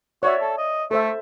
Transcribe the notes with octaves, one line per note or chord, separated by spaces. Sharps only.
F#4 C#5 D5 E5
A4
D#5
A3 A4 C5 E5